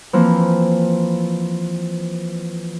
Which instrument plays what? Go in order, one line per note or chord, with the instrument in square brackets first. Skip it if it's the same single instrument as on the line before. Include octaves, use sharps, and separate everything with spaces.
[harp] E3 F3 A#3 C4